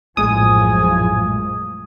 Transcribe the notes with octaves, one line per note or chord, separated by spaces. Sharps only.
A#1 F#2 A2 F3 G#3 G#5 D#6